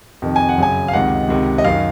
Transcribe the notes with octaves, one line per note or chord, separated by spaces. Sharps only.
F2 C3 D#3
G#5
F#5
F#2 C#3 G#5
F5
C#2 C3 D#3 F#5
C#2 C3 D#3
D#5
F#2 D#3 F5